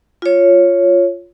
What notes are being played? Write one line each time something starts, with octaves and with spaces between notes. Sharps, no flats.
F4 C#5